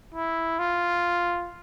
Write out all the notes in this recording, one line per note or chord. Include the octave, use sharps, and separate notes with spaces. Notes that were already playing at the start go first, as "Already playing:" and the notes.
E4
F4